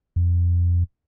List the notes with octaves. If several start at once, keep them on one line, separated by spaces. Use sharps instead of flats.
F2